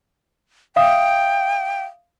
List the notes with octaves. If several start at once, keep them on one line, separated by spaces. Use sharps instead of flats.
E5 F5 G5 D#6